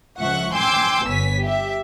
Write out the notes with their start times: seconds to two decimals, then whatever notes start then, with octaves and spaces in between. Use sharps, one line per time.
0.19 C#2 F3 E5 F#5 C#6 F#6
0.55 G5 G#5 C6 D6 E6 G6
1.08 G1 B3 C#5 G#5 B6
1.40 G4 E5